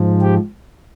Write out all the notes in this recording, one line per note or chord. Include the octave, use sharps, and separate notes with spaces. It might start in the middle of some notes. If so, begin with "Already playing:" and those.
Already playing: G#2 F3
G4